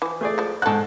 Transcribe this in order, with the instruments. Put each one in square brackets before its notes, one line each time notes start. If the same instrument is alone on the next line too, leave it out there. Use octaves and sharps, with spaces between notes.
[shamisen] E3 F3
[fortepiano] A3 G#4 D5
[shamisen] F3 G#3
[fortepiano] G#2 F#6 [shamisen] F#4 A4